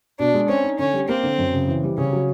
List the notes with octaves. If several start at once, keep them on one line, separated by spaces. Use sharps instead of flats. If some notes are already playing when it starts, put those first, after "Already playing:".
B2 D4
G#3
C4 C#4
D#4
D3 C#4
G3
A#3 C4
D3
F#2
C#3
E3
G3
C#3 C#4
F#3